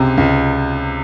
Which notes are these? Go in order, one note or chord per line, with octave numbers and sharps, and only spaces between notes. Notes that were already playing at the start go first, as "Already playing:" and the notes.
Already playing: C#2 C3
C#2